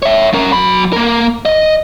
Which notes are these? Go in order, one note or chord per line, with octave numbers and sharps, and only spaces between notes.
C#5 E5
C#4 A#4
F#3 B5
A#3 A#4
D#5